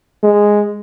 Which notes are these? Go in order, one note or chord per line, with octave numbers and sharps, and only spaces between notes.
G#3